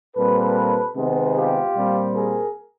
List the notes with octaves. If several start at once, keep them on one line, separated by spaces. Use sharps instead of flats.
A#2 G3 C4 A4 B4
C3 D#3 G#3 B3
F4 G4
A#2 G3 C4
G#4 A#4